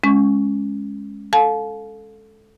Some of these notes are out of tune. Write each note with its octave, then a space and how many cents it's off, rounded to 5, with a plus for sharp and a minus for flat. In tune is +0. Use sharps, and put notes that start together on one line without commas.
G#3 +0 C#4 +0 C#6 +0
A4 +0 F5 +20 A5 -40